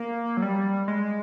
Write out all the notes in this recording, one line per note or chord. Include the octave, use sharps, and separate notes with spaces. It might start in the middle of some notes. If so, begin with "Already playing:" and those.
Already playing: A#3
F#3
G3
G#3